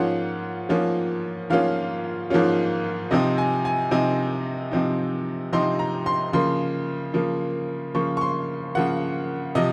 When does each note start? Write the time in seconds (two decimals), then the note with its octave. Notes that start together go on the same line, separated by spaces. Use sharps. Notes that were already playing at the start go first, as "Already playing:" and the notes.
Already playing: G#2 F3 A#3 C#4 F4 F#5
0.69 G#2 F3 A#3 C#4 F4
1.50 G#2 F3 A#3 C#4 F4 F5
2.30 G#2 F3 A#3 C#4 F4
3.11 C3 F3 C4 D#4 D#5
3.38 G#5
3.65 G#5
3.91 C3 F3 C4 D#4 G#5
4.71 C3 F3 C4 D#4
5.52 C3 F3 C4 D#4 C6
5.79 A#5
6.06 C6
6.33 C#3 F3 A#3 C6
7.14 C#3 F3 A#3
7.95 C#3 F3 A#3 C#6
8.17 C#6
8.21 C6
8.75 C#3 F3 A#3 F#5
9.55 C3 F3 D#5